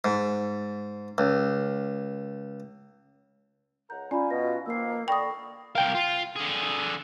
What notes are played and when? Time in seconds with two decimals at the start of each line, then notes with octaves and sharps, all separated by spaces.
0.05 G#2
1.18 C#2
3.90 C#2 F#5 A#5 G6
4.11 C#4 F4 D5 G#5 A#5 B5
4.30 B2 A#6
4.66 D#3 F3 A#3 E6 C7
5.08 D3 D5 G5 B5 C#6 D#6 A#6
5.75 C2 A#4 F5 G5
5.95 F4
6.36 D3 G#4